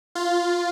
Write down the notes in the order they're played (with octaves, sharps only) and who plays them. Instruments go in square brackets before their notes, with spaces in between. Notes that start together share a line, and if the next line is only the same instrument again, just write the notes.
[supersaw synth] F4